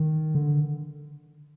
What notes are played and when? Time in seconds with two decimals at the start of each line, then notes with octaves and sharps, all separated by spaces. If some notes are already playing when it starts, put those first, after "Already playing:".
Already playing: D#3
0.35 D3